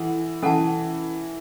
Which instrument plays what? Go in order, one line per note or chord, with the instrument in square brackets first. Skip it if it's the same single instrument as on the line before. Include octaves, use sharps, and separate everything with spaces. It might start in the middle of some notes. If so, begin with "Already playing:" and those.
Already playing: [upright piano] E3 [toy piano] A4 F#5
[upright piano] E3 [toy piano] C#4 A4 F#5 A5